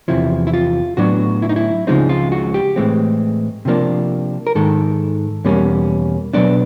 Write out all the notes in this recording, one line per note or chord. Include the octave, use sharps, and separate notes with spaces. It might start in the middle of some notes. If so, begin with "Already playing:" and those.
E2 C3 F3 E4
E4
F4
A2 F#3 B3 D4 F#4
E4
D#4
E4
C#2 C#3 F3 G#3 C4 D#4
F4
F#4
G4
A2 E3 G#3 C4
C3 F3 A#3 D4
A#4
G#2 D#3 G#3 A4
E2 B2 G3 A#3 C#4
B2 F#3 B3 D4 D5